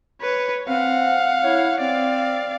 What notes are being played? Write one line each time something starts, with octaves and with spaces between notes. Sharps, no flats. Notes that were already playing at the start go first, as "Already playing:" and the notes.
B4 C#5
C4 F5 F#5
E4 C#5
C4 D5 F5